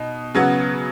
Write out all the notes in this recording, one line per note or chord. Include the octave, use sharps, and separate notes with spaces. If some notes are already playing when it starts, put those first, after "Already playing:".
Already playing: B2 D#4
C#3 F#3 B3